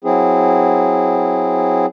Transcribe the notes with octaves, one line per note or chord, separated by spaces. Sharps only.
F#3 C4 E4 G#4